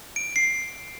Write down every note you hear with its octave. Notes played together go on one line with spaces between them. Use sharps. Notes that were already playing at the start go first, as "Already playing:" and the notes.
D7
C7